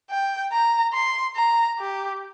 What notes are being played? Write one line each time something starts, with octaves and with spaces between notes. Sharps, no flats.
G5
A#5
C6
A#5
G4